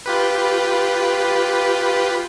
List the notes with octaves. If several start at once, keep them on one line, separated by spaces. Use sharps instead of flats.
F4 G4 B4